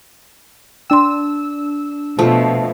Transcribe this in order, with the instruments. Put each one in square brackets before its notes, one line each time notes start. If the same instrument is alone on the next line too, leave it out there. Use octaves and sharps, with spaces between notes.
[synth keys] D4 E6 [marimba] G5 C6
[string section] B2 [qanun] F3 A3